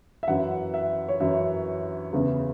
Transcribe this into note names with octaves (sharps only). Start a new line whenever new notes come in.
E5
F#2 E3 F#5
E5
C#5
F#2 E3 E5
E2 C#3 E3